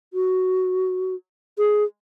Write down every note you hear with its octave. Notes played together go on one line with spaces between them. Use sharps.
F#4
G#4